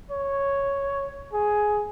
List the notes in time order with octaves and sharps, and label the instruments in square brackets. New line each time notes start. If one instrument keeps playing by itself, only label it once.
[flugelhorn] C#5
G#4